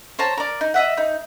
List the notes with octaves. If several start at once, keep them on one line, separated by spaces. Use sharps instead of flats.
C5 C#5 A5 A#5
A#4 D5
D#4
D#5 E5 F#5
D#4